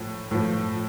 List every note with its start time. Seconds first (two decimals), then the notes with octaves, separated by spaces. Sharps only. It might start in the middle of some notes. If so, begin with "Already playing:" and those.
Already playing: A2 F3
0.31 A2 F3